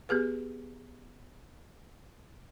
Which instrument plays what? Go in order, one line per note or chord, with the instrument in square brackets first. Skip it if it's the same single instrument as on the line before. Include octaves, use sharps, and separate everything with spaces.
[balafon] B3 G4 G#4 B4